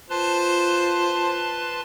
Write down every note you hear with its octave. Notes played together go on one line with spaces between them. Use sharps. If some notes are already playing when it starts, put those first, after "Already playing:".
F4 B4 C5 A5 C6